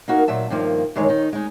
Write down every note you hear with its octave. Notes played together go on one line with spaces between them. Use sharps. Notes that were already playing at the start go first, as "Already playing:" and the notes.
A#3 D#4 F#4 A#4
A#2 F#3 E5 A5
G2 D#3 F3 A#3
F#2 D3 D#3 G#3 C#5
D#3 D#4
G#3 D#4